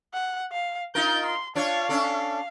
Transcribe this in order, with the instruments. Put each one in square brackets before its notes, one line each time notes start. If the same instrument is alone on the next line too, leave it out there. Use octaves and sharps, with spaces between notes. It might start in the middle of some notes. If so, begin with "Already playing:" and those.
[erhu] F#5
F5
[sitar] D#4 F4 A#4 [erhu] G6
[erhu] C6
[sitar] D4 F4 C#5 [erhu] F5
[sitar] C#4 D4 A4